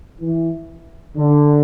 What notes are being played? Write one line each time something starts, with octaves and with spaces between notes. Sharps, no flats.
E3
D3